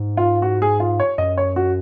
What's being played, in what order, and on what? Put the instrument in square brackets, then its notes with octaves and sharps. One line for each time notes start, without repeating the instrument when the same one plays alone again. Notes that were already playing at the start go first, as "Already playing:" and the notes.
Already playing: [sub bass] G#2
[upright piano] F4
F#4
G#4
F4
C#5
[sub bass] F#2 [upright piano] D#5
[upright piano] C#5
F#4